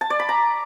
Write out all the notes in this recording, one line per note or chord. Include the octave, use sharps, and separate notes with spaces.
A5
D5
B5
A#5